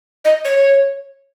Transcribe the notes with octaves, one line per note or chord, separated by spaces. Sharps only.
D#5
C#5